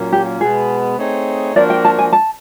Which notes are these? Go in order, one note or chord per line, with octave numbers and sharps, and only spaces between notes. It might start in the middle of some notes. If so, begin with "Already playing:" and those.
Already playing: A#2 F#3 A#3 C#4
G4
B2 G#3 B3 G#4
A3 C4 D#4 G#4 C#5
F3 A#3 D4 F#4 A#4 D5
G5
A5
G#5
A5